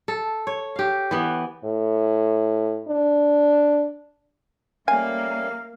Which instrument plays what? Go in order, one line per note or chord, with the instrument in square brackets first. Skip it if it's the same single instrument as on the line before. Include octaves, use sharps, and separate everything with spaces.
[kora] A4
C#5
G4 F5
E3 B3
[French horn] A2
D4
[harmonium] G3 A3 C#4 [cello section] A#3 [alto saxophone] F5 [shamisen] G#5